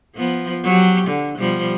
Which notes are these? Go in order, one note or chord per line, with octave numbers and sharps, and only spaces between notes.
F3 B3
F#3 G4
D3
B2 F3 G3